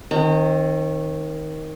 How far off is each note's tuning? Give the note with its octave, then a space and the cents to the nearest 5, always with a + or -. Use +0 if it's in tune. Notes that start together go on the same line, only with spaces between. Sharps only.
D#3 +10 C4 +45 A#5 -35